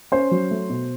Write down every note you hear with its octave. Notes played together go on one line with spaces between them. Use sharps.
C#4 C5 C6
F#3
A3
B2